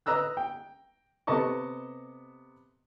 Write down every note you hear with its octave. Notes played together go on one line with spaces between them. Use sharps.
B4 D#5 A#5 E6 F#6
G5
C3 B3 A4 D#5 A5 C#6